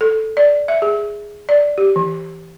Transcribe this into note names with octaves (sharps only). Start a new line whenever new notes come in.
A4
D5
E5
G#4
D5
G4
E3